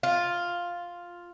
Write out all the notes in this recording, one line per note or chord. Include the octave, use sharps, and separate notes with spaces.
F4